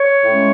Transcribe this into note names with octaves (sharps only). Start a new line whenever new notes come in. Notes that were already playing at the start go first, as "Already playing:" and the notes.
Already playing: C#5
A2 G#3 C#4